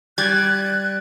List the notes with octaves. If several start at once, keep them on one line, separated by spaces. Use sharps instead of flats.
G3 F#6 G#6 A6